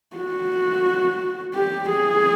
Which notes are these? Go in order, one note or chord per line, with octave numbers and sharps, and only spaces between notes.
F#4
G4
G#4